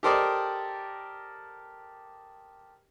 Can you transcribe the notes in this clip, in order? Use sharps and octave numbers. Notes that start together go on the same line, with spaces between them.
G4 A4 A#4 C5 D5 D#5